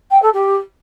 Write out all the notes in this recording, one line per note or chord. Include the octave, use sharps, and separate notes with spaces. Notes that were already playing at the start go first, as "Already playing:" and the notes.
G5
A4
G4